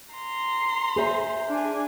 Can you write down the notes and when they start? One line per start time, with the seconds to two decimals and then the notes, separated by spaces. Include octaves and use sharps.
0.14 A#5 C6
0.96 G#4 C5 E5
1.49 D4 G#5